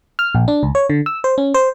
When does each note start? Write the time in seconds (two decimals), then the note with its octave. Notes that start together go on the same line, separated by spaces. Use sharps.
0.19 F6
0.35 A#1
0.48 D4
0.63 C#2
0.75 C#5
0.90 D3
1.06 E6
1.24 C5
1.38 C#4
1.54 C5